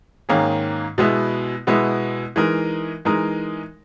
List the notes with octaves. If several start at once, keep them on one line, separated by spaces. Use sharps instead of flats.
G#2 D#3 A#3 C#4 G#4
B2 G#3 B3 E4
B2 G#3 B3 E4
E3 G#3 D#4 A#4
E3 G#3 D#4 A#4